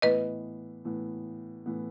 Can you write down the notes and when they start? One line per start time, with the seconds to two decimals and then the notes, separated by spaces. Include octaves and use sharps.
0.02 A2 E3 B3 B4 D#5
0.85 A2 E3 B3
1.66 A2 E3 B3